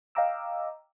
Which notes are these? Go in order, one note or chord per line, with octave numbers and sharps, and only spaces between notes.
D#5 F5 G5 A#5 D6 E6